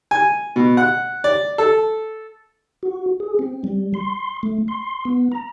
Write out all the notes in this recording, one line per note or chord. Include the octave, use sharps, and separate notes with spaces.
G#5
B2
F#5
D5
A4
F#4
G#4
C4
G3
C6
A3
C6
B3
A#5